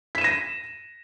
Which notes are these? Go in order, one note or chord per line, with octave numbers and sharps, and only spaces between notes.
A#6 B6 D#7 E7